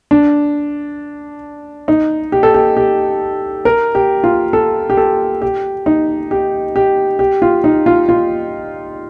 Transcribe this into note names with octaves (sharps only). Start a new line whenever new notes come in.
D4
D#4
G4
A4
G4
G4
A#4
G4
F4
A4
G4
A4
G4
D#4
G4
G4
G4
F4
D#4
F4
F4